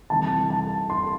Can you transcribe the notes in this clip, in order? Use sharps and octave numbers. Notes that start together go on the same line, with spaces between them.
C3 E3 G3 A5
A5
C6